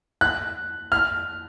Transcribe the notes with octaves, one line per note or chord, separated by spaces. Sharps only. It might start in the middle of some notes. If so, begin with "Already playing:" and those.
F#6
F6